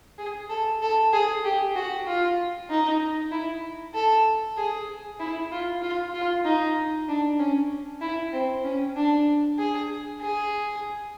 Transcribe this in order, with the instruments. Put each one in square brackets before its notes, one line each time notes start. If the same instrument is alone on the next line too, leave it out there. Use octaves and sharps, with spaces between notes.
[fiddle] G#4
A4
A4
G#4
G4
F#4
F4
D#4
E4
A4
G#4
E4
F4
F4
F4
D#4
D4
C#4
E4
C4
C#4
D4
G#4
G#4